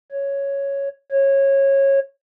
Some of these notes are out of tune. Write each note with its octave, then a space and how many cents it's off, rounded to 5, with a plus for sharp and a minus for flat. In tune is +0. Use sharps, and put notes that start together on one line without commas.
C#5 +0
C#5 -20